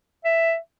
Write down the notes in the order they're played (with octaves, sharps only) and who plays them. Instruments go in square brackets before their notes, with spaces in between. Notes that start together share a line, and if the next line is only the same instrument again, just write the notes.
[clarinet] E5